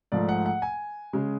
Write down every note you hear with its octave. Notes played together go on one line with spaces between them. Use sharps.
G#2 F3 A3 D5
F#5
F#5
G#5
C#3 G#3